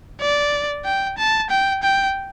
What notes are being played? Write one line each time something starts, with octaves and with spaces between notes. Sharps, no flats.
D5
G5
A5
G5
G5